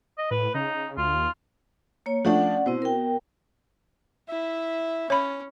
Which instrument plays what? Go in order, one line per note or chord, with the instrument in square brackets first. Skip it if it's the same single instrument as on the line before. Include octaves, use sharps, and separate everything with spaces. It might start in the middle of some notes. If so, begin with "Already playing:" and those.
[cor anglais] D#5
[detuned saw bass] A2 [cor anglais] B4
[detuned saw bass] C#3 [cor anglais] D#4
[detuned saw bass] D2 [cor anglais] F4
[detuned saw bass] D#2
[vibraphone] A#3 C#5
[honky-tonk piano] F3 A3 D4 [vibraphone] C#4 D5 F#5
[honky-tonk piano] B2 [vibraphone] C4 E4 C5
[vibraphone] A#4 G5
[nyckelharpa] E4 [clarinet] E5
[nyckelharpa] C#4 [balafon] C#5 B5